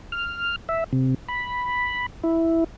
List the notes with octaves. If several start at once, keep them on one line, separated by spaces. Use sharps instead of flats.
F6
E5
C3
B5
E4